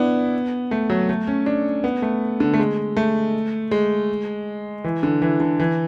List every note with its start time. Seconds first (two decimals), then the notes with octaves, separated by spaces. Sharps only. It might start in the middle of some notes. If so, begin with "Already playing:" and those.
Already playing: B3 D4 E4
0.71 A3
0.90 F#3
1.09 A3
1.27 C#4
1.46 D4
1.84 B3
2.02 A3
2.40 D3
2.54 A3
2.59 G#3
2.97 A3
3.71 G#3
4.84 E3
5.03 D3
5.22 E3
5.40 D3
5.60 E3